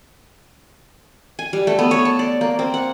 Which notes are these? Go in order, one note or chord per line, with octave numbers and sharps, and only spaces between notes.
G#5
G3
A3
B3
C#5
A5
D5
A#3
C4
F#5